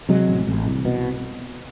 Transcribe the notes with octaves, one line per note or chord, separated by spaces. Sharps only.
C3 F#3 G#3
A1
A1
C2
B2